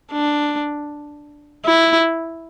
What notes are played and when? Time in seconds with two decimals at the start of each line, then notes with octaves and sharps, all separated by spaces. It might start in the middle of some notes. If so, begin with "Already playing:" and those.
0.12 D4
1.66 E4